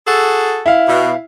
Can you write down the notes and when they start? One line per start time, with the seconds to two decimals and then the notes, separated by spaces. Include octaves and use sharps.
0.07 F#4 G#4 A4
0.66 E4 F5
0.88 B2